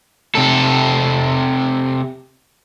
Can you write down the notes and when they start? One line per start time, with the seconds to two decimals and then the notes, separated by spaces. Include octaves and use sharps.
0.35 C3 A4